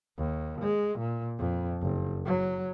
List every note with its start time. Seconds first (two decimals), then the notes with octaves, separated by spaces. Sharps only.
0.18 D#2
0.61 G#3
0.99 A#2
1.38 F2
1.81 F#1
2.25 F#3